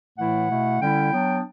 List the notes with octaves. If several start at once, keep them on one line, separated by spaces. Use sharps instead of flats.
A2 E3 A3 E4 F#5
B2 A3 E4
D3 G3 C#4 E4 G5
F#3 B3 D4